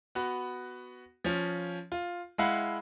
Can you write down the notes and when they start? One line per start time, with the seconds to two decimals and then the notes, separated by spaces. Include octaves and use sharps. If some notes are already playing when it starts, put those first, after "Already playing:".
0.15 B3 F#4
1.24 F3 C#4
1.92 F4
2.38 G#3 E4 F5 F#5